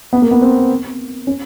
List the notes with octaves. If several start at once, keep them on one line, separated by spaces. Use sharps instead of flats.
B3
A#3
B3
C4
C#4